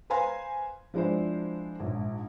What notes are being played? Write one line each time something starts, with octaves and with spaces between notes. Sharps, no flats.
B4 C5 F5 G#5 A#5 C6
F3 G#3 D4 E4 C5
A#1 G#2